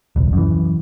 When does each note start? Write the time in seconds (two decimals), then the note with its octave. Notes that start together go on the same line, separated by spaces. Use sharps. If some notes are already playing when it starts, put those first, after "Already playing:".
0.16 D#1 C2
0.33 F#2 E3